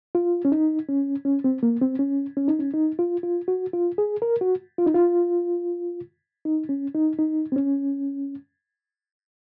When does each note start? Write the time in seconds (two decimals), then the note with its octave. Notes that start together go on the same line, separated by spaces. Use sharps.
0.15 F4
0.45 C#4
0.52 D#4
0.89 C#4
1.25 C#4
1.44 C4
1.63 A#3
1.81 C4
1.99 C#4
2.37 C#4
2.48 D#4
2.59 C#4
2.74 D#4
2.99 F4
3.23 F4
3.48 F#4
3.73 F4
3.98 G#4
4.22 A#4
4.41 F#4
4.78 F4
4.86 D#4
4.94 F4
6.45 D#4
6.69 C#4
6.94 D#4
7.19 D#4
7.52 C4
7.56 C#4